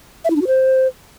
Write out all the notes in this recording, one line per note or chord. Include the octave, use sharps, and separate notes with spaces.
E5
E4
D4
F#4
C5